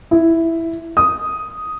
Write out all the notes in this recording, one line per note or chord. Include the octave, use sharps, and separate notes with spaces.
E4
D#6